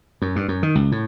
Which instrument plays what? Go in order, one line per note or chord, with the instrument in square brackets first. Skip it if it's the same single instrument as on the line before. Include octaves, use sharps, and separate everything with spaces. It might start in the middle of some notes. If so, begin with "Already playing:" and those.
[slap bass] F#2
G2
F#2
D#3
C#2
A2